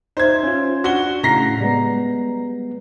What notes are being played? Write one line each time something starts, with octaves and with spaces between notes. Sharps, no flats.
D#4 C5 E5 G#6
C#4 F4
D4 F#4 G7
A2 C#3 A#5 A#6 C7
G3 G#3 B3